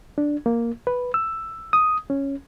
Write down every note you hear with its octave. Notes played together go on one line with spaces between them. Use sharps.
D4
A#3
B4
E6
D#6
C#4